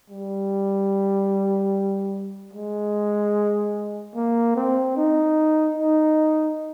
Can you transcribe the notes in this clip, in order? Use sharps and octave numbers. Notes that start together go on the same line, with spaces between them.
G3
G#3
A#3
C4
D#4
D#4